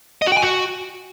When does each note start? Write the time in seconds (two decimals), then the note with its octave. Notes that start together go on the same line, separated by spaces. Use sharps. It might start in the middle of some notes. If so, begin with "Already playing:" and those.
0.22 D#5
0.27 F#4
0.32 G5
0.37 G#5
0.42 F#4